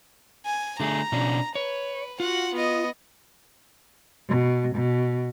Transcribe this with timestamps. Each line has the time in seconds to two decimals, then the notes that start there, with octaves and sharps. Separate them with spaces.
0.46 G#5
0.80 D3 A3 G#4 A#5
1.12 B2 C#4 D4
1.55 B4 C#5
2.20 F4 F#4 F#5
2.53 B3 D#5
4.29 B2
4.75 B2